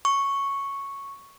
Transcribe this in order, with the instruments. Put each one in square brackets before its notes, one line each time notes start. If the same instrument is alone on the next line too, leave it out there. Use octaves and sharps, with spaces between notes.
[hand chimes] C#6